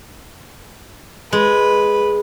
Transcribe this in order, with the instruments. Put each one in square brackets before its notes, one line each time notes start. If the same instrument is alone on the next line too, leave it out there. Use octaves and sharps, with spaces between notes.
[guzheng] G#3 [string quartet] B4